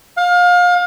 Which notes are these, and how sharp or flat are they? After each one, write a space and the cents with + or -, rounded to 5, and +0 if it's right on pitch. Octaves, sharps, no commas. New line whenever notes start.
F5 +30